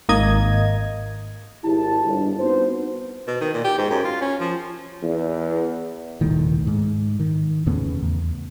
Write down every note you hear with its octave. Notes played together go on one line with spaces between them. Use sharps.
G#1 A#3 D#5 G#6
G#1 E4 G4 A5
G1
B3 C4 D#4 F#4 C5
B2
D#3
A#2
G4
G#2
F#2
F4
C#4
F3
E2
D#1 C2 A2 D#3
G#2
D#3
E2 A2 C#3 B3
E2